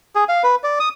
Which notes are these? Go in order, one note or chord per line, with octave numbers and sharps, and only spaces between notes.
G#4
F5
B4
D5
D#6